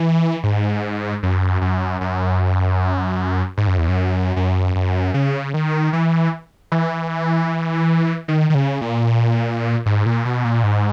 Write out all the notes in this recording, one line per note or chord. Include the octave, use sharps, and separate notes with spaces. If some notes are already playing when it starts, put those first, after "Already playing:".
Already playing: E3
G#2
F#2
F#2
F#2
G#2
F#2
E2
F#2
F#2
F#2
C#3
D#3
E3
E3
D#3
D#3
C#3
A#2
G#2
A#2
B2
A#2
G#2